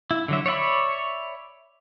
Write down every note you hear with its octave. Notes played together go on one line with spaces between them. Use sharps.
E4
D3 F#3 E5
C#5 D5 E5 B5